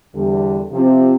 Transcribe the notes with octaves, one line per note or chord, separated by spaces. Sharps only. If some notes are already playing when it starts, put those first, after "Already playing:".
E2 D3 G3
C3 F3 C4